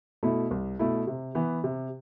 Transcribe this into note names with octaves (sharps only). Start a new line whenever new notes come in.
B2 A3 E4
C2
B2 A3 E4
C3
E3 B3
C3